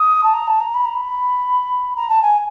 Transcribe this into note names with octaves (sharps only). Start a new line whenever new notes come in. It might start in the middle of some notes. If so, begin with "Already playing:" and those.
Already playing: D#6
A5
A#5
A5
A#5
B5
A#5
B5
A#5
A5
G#5